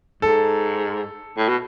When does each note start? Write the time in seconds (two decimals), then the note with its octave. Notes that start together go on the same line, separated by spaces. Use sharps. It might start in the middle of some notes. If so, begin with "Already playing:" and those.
0.22 G#2 A4
1.37 A2
1.48 B2